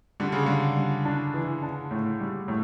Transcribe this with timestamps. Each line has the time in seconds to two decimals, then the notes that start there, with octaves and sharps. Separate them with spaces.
0.20 D3 G3
0.32 C#3
0.46 D3 G3
0.76 G3
1.05 D4
1.34 E3
1.63 D4
1.91 A2
2.20 G3
2.48 A2